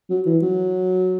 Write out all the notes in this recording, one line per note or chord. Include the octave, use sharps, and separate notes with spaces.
F#3
E3
F#3